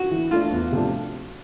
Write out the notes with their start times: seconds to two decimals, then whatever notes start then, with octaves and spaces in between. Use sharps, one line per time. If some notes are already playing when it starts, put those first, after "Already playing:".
Already playing: F#4
0.11 E3
0.31 A3 D4 F4
0.52 E2
0.72 C3 F3 A3 D4